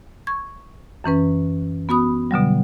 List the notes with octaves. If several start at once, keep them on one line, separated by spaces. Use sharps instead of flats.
C#6 G#6
F#2 E3 C#4 B4
B3 F#4 B5 D#6
B2 D3 F#3 G3